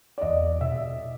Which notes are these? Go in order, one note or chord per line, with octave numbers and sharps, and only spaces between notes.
D5
E2 D#5
B2 E5